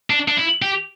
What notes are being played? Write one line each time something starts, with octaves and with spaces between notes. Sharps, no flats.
D4
D4
E4
G4